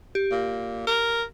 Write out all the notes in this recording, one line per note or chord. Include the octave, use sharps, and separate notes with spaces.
G4
A#2
A#4